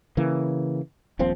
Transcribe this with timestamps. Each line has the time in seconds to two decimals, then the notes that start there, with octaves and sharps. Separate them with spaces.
0.17 C#3 E3 A#3
1.19 D#1 A#1 F3 C4